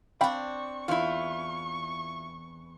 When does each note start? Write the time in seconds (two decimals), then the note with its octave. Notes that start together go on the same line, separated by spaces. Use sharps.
0.21 C4 D4 F5 G5 B5 C#6
0.88 E2 E4 F4